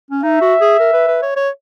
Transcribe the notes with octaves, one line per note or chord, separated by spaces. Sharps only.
C#4
D#4 E5
F#4
G#4
A#4
B4
B4
C#5
C#5